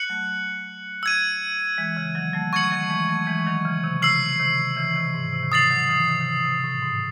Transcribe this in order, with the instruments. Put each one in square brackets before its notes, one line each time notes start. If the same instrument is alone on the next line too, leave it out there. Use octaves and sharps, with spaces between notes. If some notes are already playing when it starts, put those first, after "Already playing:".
Already playing: [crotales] F#6 C#7 F#7
[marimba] F#3 A3
[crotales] E6 G#6 D#7
[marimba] E3 G#3
C#3 E3
D#3 F#3
F#3 A3
[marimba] F#3 A3 [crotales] C#6 G#6 C#7 F#7
[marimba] D#3 F#3
A3
E3 G#3
F#3 A3
E3 G#3
G#3
D#3 F#3
C#3 E3
C3 D#3
[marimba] C#3 [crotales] E6 C7 F#7
[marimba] C3 D#3
C#3 E3
C3 D#3
G#2
C3
D#3
[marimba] C#3 [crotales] D#6 A6 C7 F#7
[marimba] D#3 F#3
C#3 E3
C3 D#3
D#3
C#3
C3
C3
A2
G#2